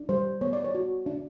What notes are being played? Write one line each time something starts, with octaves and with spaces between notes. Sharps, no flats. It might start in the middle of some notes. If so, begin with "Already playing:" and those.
Already playing: D4
G3 C5
B3 C#5
D5
C#5
F#4
D4